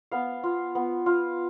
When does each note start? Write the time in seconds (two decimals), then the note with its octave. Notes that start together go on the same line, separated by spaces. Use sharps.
0.12 B3 F5
0.44 F4
0.75 B3
1.06 F4